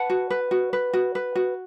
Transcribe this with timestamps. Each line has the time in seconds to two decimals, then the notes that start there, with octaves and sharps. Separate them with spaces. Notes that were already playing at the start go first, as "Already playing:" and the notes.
Already playing: B4 F#5 A5
0.10 F#4
0.30 B4
0.51 F#4
0.73 B4
0.93 F#4
1.15 B4
1.35 F#4